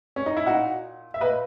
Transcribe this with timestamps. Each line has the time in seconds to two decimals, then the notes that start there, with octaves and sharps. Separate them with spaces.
0.16 C#4
0.26 D#4
0.37 E4
0.46 A#2 D#4 F#4
1.14 E5
1.21 A#2 B4 D#5